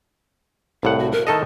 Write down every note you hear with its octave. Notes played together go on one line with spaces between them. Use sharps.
C2 A2 F5 F#5
F#4
A#4
D#3 A4 D#5 A5